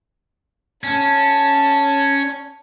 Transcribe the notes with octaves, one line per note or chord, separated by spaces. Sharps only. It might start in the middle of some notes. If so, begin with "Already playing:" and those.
C#4 A5